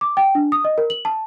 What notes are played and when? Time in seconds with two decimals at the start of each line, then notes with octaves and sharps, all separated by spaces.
0.01 D6
0.17 G5
0.35 D4
0.52 D#6
0.64 D#5
0.78 A#4
0.90 F#7
1.05 A5